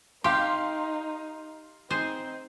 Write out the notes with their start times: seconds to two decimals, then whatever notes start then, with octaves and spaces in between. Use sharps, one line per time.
0.24 D#4 G4 F5 C6
1.90 C4 D#4 G#4 C5